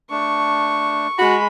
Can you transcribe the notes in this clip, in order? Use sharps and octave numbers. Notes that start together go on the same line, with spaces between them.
A3 D4 C#6
G#3 F#4 B5